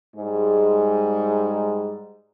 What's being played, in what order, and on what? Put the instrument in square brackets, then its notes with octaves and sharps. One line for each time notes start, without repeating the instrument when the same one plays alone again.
[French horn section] G#2 G3 G#3